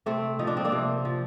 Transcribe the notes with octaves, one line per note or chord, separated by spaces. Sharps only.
C3 A3 C4
F3 D#4
D4
C4
A#3 D4
C3
F3